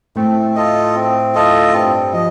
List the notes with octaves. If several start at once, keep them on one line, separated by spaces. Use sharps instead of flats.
A2 A3 C4
F4 A4 D#5
C4
F4 A4 D#5
G2 G3 C4
F3 D#5